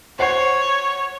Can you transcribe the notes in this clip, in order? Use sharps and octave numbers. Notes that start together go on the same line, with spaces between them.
C5 C#5 F#5 C7